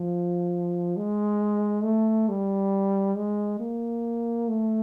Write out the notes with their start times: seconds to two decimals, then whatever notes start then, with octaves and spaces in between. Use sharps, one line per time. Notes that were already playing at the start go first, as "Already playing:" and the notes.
Already playing: F3
0.97 G#3
1.84 A3
2.29 G3
3.16 G#3
3.60 A#3
4.48 A3